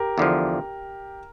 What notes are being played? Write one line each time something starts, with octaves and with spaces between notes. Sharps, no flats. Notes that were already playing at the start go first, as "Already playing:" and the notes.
Already playing: G4 A#4
E2 D3 F3